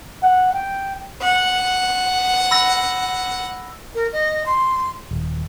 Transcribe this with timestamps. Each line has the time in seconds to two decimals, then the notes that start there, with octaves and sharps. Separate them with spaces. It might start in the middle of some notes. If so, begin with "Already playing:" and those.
0.23 F#5
0.53 G5
1.22 F#5
2.51 B5 E6 A#6
3.95 A#4
4.13 D#5
4.46 C6
5.11 D#1